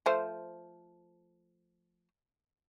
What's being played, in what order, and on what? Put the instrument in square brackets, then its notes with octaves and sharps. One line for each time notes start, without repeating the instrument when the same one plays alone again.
[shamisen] F3 A3 C5